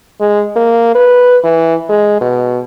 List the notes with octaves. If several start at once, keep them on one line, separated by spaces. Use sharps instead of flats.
G#3
A#3
B4
E3
G#3
B2